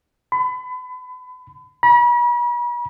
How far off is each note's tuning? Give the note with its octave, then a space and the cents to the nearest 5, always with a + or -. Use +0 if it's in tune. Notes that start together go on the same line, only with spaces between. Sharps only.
B5 +35
B5 -40